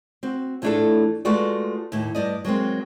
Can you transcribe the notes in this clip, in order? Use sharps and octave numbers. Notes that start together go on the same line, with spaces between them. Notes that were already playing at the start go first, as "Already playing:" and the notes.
C4 F#4
A2 E3 A3 D4 F4 A4
G#3 A3 F4 F#4 B4 D5
D#2 A2
G2 D5 D#5
F#3 G#3 A#3 C4